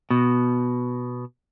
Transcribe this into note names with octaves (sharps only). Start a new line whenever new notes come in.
B2